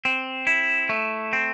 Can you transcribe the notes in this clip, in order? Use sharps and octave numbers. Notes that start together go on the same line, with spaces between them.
C4
E4
A3
C4